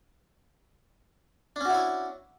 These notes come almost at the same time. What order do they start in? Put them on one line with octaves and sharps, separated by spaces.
D4 C#4 F#4 E4 C#5